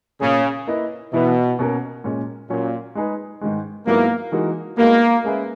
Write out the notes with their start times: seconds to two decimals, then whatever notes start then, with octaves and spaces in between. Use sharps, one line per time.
0.21 A#2 C#3 A#3 C#4
0.67 A#3 E4 B4 D#5
1.13 B2 E3 B3 E4 B4 E5
1.59 B2 A#3 C#4 F#4 A#4
2.04 A#2 G#3 C#4
2.50 A#2 F#3 C#4 F#4 C#5
2.95 G#3 D#4 G#4 B4
3.41 G#2 D#3 G#3
3.86 G#2 F#3 A#3 B3 E4 A#4
4.32 E3 G#3 D#4 F#4 A#4
4.78 G#3 A#3 B3 D#4 F#4 B4
5.24 G#3 C#4 G#4 B4 E5